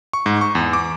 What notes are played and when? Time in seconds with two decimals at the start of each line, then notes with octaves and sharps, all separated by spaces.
0.13 C#6
0.26 G#2
0.41 C#6
0.55 E2
0.73 D6